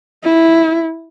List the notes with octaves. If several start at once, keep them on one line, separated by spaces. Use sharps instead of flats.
E4